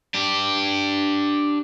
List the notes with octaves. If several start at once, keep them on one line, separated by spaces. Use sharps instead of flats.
D4 G4